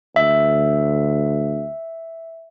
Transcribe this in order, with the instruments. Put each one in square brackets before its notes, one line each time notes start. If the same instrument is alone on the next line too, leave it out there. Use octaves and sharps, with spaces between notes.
[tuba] D2 [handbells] E5